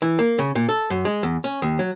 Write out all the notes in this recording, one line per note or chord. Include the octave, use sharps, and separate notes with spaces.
E3
A#3
C#3
A#2
A4
F#2
G#3
E2
C#4
D#2
F#3